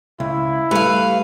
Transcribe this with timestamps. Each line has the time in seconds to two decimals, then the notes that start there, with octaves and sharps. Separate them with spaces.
0.20 C#2 E4
0.71 G3 A3 B4 F5